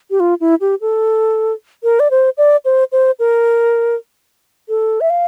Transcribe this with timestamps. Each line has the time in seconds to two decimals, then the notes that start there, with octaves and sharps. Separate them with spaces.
0.11 G4
0.20 F4
0.40 E4
0.61 G4
0.81 A4
1.83 A#4
2.00 D5
2.11 C5
2.38 D5
2.65 C5
2.92 C5
3.19 A#4
4.69 A4
5.01 E5
5.10 F5